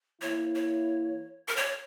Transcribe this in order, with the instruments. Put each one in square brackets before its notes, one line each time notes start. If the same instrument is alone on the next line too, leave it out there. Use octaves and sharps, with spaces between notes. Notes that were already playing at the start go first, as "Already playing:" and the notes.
[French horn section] E3 A#3 E4 [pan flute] C#5
[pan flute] C#5
A#4
C#5